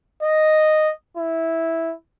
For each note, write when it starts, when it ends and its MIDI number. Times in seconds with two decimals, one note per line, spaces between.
0.22 0.92 75
1.17 1.94 64